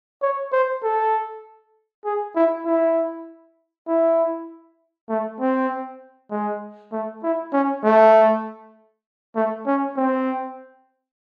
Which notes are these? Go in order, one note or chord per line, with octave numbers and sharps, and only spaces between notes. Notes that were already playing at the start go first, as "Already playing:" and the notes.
C#5
C5
A4
G#4
E4
E4
E4
A3
C4
G#3
A3
E4
C#4
A3
A3
C#4
C4